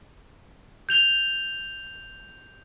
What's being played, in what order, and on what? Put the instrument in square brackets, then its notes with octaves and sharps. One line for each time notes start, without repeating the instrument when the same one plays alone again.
[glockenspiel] G6 F7 G7